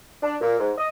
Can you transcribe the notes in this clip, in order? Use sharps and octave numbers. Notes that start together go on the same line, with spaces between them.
D4
A#2
G#2
D#5